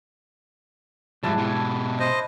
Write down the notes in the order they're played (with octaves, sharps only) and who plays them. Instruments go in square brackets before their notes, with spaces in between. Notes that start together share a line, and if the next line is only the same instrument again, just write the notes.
[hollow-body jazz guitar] D2 G#2 [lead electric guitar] F3 G3 [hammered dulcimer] D4 E4 A5
[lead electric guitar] B2 G4
[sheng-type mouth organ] C5 D#5